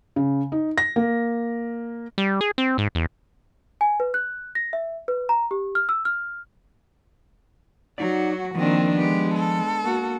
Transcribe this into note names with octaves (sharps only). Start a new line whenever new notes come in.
C#3
D#4
A#6
A#3
G3
G#4
C4
G#2
E2
G#5
B4
F#6
A#6
E5
B4
A#5
G4
F6
E6
F6
F#3 D#4 F#4 D5
D#3 F3 A#3 C4 D4
G#3 B3 G4
A4
A#3 F#4